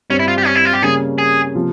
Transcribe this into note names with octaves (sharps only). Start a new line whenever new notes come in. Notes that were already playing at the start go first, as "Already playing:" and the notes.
G2 G3 C4 C#4
E4
F4
G4
C#4
E4
F4
G4
C#3 G3 A#3 C#4 G#4
G#4
C3 F3 A#3 F4